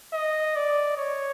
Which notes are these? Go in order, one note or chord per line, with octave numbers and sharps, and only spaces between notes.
D#5
D5
C#5